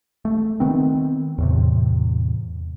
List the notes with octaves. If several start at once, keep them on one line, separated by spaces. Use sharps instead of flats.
A3
D#3 B3 C4
E2 A2 C3